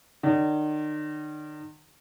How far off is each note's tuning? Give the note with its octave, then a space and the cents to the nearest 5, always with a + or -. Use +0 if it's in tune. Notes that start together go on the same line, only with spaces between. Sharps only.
D#3 -40 D5 -40